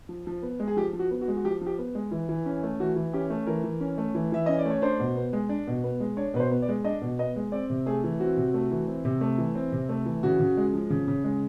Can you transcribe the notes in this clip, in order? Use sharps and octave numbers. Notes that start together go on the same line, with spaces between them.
F3
F3
B3
G#3
G#4
F3 G4
F3
F#4
B3
F#4
G#3
F#4
F3 G4
F3
G4
B3
G#3
E3
E3
C#4
A3
E3 F#4
E3
C#4 G4
A3
E3 A#4
E3
C#4
A3
E3
E3 E5
C#4 D#5
D5
A3 C#5
D4 C5
B2
B3
G#3
D4
B2
B3
G#3
D4 C#5
B2 B4
C5
B3
D5
G#3
D4 D#5
B2
B3 D#5
G#3
C4 D5
C3
A3 G#4
E3
C4 F#4
C3
A3
E3
C4
C3
A3
E3
C4
C3
A3
E3
C#3 F#4
C#3
G#3
F3
C#3
C#3
G#3